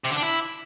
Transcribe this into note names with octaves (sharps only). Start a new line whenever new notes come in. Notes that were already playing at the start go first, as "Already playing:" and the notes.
C3
D3
D4
E4